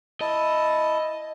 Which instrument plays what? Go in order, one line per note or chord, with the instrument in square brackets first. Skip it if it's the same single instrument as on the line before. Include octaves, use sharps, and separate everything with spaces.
[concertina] E4 A5 [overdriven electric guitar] D#5